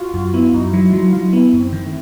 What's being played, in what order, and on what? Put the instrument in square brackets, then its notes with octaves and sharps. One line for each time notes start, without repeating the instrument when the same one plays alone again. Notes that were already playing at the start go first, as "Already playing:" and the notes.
Already playing: [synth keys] F4 F#4
[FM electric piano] F#2 [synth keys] F4
[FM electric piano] B3 [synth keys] E4
[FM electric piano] F#2 [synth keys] D#4
[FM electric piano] F#3 [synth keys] E4
[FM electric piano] F#3 [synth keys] F4
[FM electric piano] F#3 [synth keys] F4
[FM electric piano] B3 [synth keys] E4
[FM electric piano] F#2
[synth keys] C4
[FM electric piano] D#3
[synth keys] A3